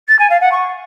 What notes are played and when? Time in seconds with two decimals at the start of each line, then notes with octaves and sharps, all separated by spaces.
0.08 A6
0.19 G#5
0.30 F5
0.40 F#5
0.51 C#6